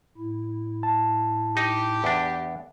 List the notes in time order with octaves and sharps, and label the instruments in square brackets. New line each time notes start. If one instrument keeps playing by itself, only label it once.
[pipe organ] A2 E4
[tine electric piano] A5
[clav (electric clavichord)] D#4 [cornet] G4
[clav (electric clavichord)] E2 D4